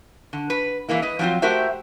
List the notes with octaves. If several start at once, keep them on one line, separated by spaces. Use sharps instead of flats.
D3
B4
E3 G#3 A#3 E4
B4 D#5
F3 F#3 B3 C4 F4
A3 F#4 G4 A#4 C5 E5